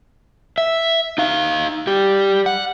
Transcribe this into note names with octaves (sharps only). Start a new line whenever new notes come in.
E5
D#4 F5
G3 G4
F#5